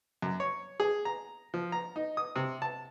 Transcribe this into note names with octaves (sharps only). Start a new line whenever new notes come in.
F#2
C#5
G#4
A#5
F3
A#5
D#4
D#6
C3
A5